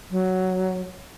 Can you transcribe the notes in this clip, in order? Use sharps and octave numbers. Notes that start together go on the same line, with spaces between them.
F#3